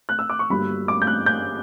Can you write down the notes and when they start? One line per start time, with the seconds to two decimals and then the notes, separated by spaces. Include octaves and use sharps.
0.09 F#6
0.19 E6
0.30 D6
0.39 C#6
0.50 G1 G2 F#3 A#3 B5
0.88 D6
1.02 G6
1.07 F#6
1.26 G6